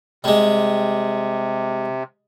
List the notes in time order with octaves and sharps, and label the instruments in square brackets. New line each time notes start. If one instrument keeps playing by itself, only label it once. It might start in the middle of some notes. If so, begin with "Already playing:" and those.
[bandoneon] C3 [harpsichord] G3 G#3